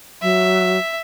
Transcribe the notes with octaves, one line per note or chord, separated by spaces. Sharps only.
F#3 E5